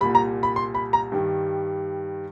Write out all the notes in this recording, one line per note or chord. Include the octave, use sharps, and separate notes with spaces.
C2 A#2 G3 B5
A#5
B5
C6
B5
A#5
G2 D#3 G3